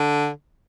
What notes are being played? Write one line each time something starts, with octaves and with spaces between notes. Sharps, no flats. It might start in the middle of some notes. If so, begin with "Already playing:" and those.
Already playing: D3